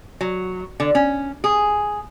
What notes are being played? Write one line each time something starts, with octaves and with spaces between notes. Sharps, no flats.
F#3
D3
C#4
G#4